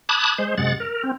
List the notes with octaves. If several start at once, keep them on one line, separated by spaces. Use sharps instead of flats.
A5 B5 D6 D#6 F#6 G#6
G#3 C5
F#2 C3 G#3 F#5 A6
A#4
C4